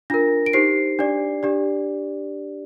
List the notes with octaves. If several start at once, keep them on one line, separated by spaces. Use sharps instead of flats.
D4 F4 A#4 A#6
D7
D#4 G4 C5 C7
D4 G4 D5
D4 G4 D5